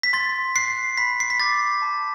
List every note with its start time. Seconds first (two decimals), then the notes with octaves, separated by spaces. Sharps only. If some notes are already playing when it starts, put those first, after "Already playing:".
0.03 B6
0.13 C6 A6
0.56 F#6 C7
0.97 B5 B6
1.20 C7
1.30 B6
1.40 D6 G6 A6
1.82 A5